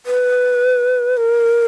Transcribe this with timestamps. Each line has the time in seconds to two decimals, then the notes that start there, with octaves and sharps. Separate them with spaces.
0.06 B4
1.17 A#4